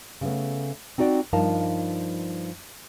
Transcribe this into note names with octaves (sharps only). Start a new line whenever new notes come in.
C#3 A3 B3
C4 D#4 F#4 D5 G5
G2 F3 D#4 A#4 F5 A5